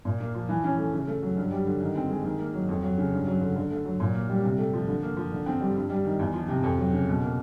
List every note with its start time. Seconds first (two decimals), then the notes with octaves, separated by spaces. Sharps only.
0.05 A#2
0.20 A#3
0.34 F3
0.49 E3
0.64 C#4
0.78 A3
0.93 C#3
1.07 A3
1.22 F#3
1.37 G2
1.51 G3
1.66 D3
1.81 D#3
1.95 C4
2.10 G#3
2.24 D#3
2.39 A#3
2.54 F#3
2.69 F2
2.83 F#3
2.98 C#3
3.12 G2
3.27 F#3
3.41 D3
3.56 D3
3.71 A3
3.85 F#3
4.00 A#2
4.15 A#3
4.29 G3
4.43 C3
4.58 A3
4.73 F3
4.88 D3
5.03 A#3
5.17 F3
5.32 D3
5.46 C4
5.61 G3
5.75 G2
5.90 G3
6.05 D#3
6.19 E2
6.34 F3
6.48 C3
6.63 F2
6.78 F#3
6.93 C#3
7.08 B2
7.22 A#3